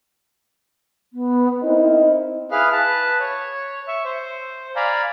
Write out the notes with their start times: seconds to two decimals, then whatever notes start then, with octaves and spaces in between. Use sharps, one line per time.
1.13 B3
1.63 C4 D#4 E4 A#4
2.51 E4 G#4 B4 F5 F6
2.72 B4 A5
3.20 C#5
3.88 E5 C#6
4.05 C5
4.76 D5 F5 G#5 A#5 B5